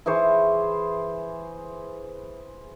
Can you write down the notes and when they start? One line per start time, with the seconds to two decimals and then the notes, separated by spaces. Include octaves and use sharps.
0.06 E3 G#4 C5 C#6